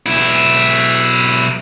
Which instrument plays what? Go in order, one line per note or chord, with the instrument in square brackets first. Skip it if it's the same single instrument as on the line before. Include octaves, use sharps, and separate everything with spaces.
[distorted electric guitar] B1 E4